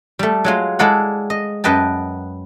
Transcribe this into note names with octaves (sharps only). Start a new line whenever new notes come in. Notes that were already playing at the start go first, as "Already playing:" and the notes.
G3 A3
F#3 G#3 F4
G#3 E4 A4 D5 F5 F#5
D#5
F#2 B4 D#5 G5 A5